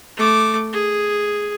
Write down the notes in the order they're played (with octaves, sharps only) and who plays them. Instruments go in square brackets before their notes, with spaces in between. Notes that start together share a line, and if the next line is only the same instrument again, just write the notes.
[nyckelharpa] A3 D6
G#4